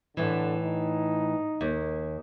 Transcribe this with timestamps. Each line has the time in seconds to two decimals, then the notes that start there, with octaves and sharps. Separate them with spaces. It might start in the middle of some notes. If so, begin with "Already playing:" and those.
0.17 A2 D3 E3
0.60 D#4
1.61 D#2